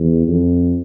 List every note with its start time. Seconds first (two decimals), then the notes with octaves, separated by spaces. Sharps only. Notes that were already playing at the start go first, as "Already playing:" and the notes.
Already playing: E2
0.28 F2